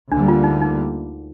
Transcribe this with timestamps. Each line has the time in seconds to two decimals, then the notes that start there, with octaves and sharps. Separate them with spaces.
0.11 D2 D3 G3 A#3 D4
0.28 F4
0.44 D#4
0.62 D#4